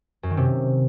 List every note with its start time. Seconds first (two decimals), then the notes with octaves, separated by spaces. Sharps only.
0.23 F#2
0.30 D#3
0.37 C3